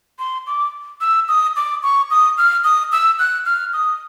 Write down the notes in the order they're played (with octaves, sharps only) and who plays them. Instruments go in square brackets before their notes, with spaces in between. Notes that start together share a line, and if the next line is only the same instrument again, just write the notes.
[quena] C6
D6
E6
D#6
D6
C#6
D#6
F6
D#6
E6
F#6
F6
D#6